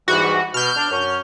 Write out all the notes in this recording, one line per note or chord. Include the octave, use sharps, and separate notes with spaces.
G#2 E3 G3 F#4
B2 F6 G6
D4
F#2 C#4